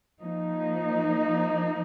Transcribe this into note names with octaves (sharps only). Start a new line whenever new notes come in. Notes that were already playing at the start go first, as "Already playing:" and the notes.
F3 A#3 D#4